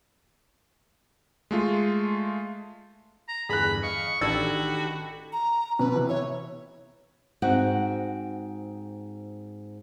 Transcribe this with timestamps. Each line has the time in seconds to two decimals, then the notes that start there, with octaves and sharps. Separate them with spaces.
1.51 G#3 A3 F4
3.28 A#5
3.49 E2 G2 D3 G#4 B5 F#6
3.83 D#5 F5 C#6
4.21 A1 D#3 D4 F#4 G4 A4 B5 G#6
5.33 A#5
5.79 B2 B4
5.95 C3 E3
6.09 E4 C#5
7.42 G#2 C4 F#4 F#5